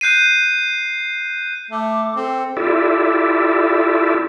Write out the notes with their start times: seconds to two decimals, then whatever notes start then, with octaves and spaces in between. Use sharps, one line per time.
0.01 F#6 G6 C7 D#7
1.71 A3 D6
2.16 C4 A4
2.57 E4 F4 G4 A4 D5 E5